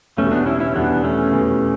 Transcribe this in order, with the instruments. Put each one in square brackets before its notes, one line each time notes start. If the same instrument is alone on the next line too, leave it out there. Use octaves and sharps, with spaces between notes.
[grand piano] E2 B2 G3 [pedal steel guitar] A3 C#4
[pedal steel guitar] B3 D4
C#4 E4
C#4 E4
[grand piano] E2 B2 G3 [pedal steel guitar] B3 D4
[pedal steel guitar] A3 C#4
[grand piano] E2 B2 G3